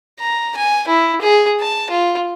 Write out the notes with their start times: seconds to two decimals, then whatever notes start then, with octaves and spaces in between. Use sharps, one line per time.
0.20 A#5
0.57 G#5
0.88 E4
1.21 G#4
1.60 A5
1.90 F4